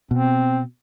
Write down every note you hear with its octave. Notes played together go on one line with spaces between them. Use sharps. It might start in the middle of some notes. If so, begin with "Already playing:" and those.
B2 C4